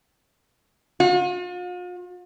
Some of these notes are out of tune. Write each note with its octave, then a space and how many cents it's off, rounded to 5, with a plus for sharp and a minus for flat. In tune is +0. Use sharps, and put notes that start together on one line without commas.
F4 +45